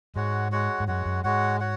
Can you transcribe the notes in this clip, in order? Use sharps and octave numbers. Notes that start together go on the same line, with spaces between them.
G#2 G#3 F#4 C#5 F#5
G#3 F#4 C#5 F#5
G#2
F#2 G#3 F#4 C#5 F#5
F#2
G#2 G#3 F#4 C#5 F#5
F#4 C#5 F#5